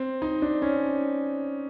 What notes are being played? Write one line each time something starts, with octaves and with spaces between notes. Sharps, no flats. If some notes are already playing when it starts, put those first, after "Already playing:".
Already playing: C4
D#4
D4
C#4